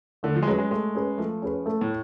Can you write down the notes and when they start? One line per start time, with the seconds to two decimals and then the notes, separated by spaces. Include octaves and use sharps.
0.23 D3 A3
0.35 F3
0.42 G#3
0.47 F#3 C#4 G#4 B4
0.58 G#3
0.71 G#3 A3
0.94 C#4 G#4 B4
1.18 F3 A3
1.42 C#4 G#4 B4
1.66 A3
1.81 A2